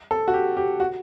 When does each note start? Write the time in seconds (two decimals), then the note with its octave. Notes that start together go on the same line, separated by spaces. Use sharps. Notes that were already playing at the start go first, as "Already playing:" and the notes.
0.11 A4
0.28 F#4
0.34 G4
0.57 G4
0.80 F#4